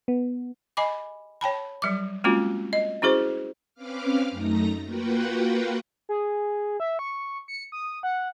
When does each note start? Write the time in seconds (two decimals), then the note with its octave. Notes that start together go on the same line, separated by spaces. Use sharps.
0.08 B3
0.77 D#5 G#5 B5 D6
1.41 C#5 G5 A5 B5
1.82 F#3 G3 D6
2.24 G#3 A#3 C4 C#4 F4 F#4
2.73 D#5
3.02 C#4 E4 F#4 G#4 C5
3.74 C4 C#4 B4 F5 D6 F6
4.31 F#2 A3 D#4 A#5 A#6
4.83 A#3 F4 F#4 B4 F#5 G5
6.09 G#4
6.80 E5
6.99 C#6
7.48 C#7
7.72 D#6
8.03 F#5